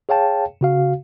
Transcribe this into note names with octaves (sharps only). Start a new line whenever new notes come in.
G#4 C#5 F5 G5 A5
C#3 F#4 F5